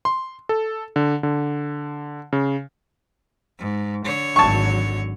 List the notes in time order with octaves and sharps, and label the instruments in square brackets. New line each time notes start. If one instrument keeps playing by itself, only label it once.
[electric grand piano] C6
A4
D3
D3
C#3
[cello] G#2
D3 C#5
[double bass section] G#1 F#3 [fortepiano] A5 C#6